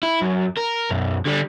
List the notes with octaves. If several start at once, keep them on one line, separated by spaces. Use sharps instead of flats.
E4
F#2
A#4
B1 F#2
D3 G3